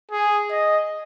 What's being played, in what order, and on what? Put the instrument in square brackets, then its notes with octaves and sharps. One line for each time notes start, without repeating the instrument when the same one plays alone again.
[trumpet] G#4
D#5